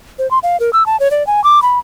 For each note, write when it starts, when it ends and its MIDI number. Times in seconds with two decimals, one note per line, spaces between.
0.19 0.29 72
0.31 0.39 84
0.43 0.59 77
0.60 0.70 70
0.73 0.86 88
0.86 0.99 81
1.00 1.11 73
1.11 1.25 74
1.27 1.43 80
1.44 1.62 86
1.62 1.79 83